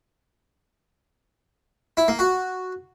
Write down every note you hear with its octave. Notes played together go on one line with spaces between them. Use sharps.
E4
A#3
F#4